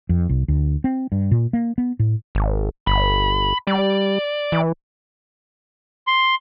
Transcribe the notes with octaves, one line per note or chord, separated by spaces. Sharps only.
F2
C2
D2
C4
G2
A#2
A#3
B3
A2
G#1
G1 B5
G3 D5
E3
C6